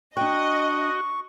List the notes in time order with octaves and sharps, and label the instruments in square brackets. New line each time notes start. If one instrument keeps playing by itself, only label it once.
[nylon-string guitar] D4 G5 [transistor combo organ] F#4 [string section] D#5 [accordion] C#6